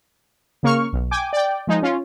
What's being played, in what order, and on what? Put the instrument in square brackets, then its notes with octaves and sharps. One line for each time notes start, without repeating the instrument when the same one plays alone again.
[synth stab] C#3 A#3 C#6 F6
B1
G5 G#5 D6
D5 G5
F3 G#3 D#4
C#4 F4